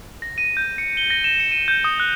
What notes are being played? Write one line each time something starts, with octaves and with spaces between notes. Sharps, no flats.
A#6
D#7
G6
C#7
G7
A#6
E7
C#7
D#7
G6
D#6
F#6